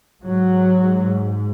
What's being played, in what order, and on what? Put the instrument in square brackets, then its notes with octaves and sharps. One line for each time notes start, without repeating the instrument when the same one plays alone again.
[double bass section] G#2 F#3